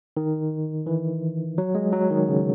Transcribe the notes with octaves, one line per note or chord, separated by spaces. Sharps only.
D#3
E3
F#3
G#3
F#3
D#3
C#3